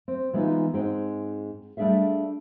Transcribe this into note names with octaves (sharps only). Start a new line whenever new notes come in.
C4
E3 G#3 B3 D4 D#4 F4
G#2 G#3 C4 D#4 G5
G3 A3 D4 G#4 E5 F5